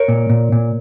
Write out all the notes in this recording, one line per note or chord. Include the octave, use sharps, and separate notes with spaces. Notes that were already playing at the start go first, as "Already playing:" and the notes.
Already playing: A#4 C#5
A#2
A#2
A#2